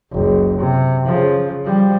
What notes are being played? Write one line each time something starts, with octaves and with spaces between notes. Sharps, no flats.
F#1 C#2
C3
C#3 F3
F3 G3